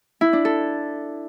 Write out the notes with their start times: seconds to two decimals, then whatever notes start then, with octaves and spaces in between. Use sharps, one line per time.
0.21 E4
0.33 D4
0.45 A4